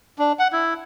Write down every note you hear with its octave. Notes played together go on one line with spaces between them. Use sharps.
D4
F#5
E4